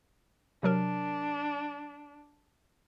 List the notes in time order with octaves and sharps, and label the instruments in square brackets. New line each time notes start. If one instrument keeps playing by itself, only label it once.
[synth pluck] C3 F#3 A#4 [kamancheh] D4